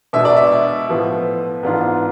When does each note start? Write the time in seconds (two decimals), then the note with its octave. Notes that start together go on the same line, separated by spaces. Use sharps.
0.13 B2 G#3 D4 E5
0.25 D5
0.37 E5
0.89 A2 F3 B3
1.63 G#2 E3 B3 D4 F4